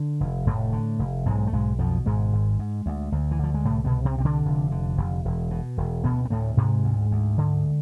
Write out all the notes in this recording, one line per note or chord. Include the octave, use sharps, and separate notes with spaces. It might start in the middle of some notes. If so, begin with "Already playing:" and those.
Already playing: D3
F1
F1 A2 A3
D3
F1
B1 G#2 G#3
A3
B1 G#2 G#3
F2 B2 F3
G#1 G#2 G#3
G#1
G#2
D2
D2
E3
D3 F3
G#3
C2 A2 A3
B2 B3
C2
C3 C4
C3 C4
D3 D4
F1
D3
F1
E1
B2
E1
D2 B2 B3
B3
D2 A2 A3
G#2 C3 G#3
D2
D2
D3